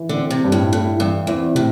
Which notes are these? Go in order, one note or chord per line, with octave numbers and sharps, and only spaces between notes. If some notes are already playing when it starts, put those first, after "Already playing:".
Already playing: E3
D3
C4
C3
G2
A2
A2 A4
G2 E3
E2 C4
A2 C3